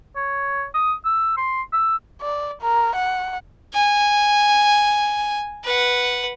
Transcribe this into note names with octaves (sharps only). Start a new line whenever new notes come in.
C#5
D#6
E6
C6
E6
D5
A#4
F#5
G#5
B4 F#5